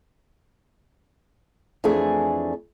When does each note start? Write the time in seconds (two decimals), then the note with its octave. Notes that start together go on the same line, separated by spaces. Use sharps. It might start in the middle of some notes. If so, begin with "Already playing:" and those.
1.84 F2 E3 A3 D4 G#4 G#5